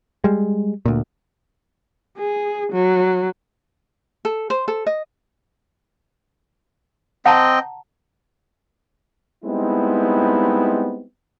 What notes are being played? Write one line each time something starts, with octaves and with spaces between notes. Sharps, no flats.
G3 G#3
D2 A#2
G#4
F#3
A4
C5
A4
D#5
C4 D#5 F#5 G5 A5 A#5
G3 G#3 B3 C4 D#4 E4